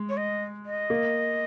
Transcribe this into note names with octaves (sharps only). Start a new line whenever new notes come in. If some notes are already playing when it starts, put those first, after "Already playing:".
Already playing: G#3
C#5
D#5
D#5
A#3